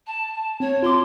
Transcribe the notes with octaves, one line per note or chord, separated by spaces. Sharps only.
A5
C4 C#5
F4 C6 D6